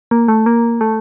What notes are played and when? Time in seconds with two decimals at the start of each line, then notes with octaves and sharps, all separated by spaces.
0.11 A#3
0.28 A3
0.46 A#3
0.81 A3